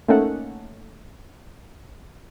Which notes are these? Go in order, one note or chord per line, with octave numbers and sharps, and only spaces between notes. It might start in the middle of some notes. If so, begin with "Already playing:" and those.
A3 A#3 C#4 D#4 A4 F#5